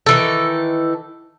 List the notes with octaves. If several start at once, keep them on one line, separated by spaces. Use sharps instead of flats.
D#3 E3 A4